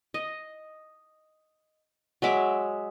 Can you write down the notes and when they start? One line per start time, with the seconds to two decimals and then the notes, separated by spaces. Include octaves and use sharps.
0.14 D#5
2.22 F#3 G#3 E5 D6